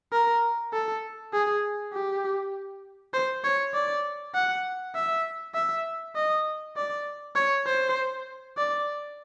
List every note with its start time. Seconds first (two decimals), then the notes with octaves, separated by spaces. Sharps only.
0.13 A#4
0.73 A4
1.33 G#4
1.93 G4
3.13 C5
3.44 C#5
3.74 D5
4.35 F#5
4.95 E5
5.55 E5
6.16 D#5
6.76 D5
7.36 C#5
7.66 C5
8.57 D5